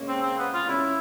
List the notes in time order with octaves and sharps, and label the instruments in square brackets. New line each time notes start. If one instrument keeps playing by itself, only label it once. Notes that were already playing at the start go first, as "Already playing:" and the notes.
Already playing: [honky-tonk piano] G#3 A#3 C#4
[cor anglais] C4
C4
B3
F4
[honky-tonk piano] C#4 [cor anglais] E4